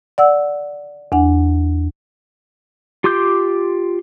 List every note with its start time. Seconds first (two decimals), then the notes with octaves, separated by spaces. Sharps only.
0.18 D5 F#5 E6
1.12 E2 D4 F#5
3.04 F4 G4 C6 D6 G6